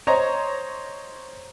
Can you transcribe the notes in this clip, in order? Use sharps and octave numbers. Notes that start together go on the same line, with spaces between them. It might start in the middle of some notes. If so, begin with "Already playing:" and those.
C5 C#5 D#5 A#5